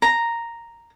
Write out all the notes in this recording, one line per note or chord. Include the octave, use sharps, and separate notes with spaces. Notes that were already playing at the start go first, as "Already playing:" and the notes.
A#5